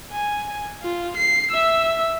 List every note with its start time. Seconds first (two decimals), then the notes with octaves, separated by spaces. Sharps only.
0.12 G#5
0.82 F4
1.17 C7
1.51 E5 E6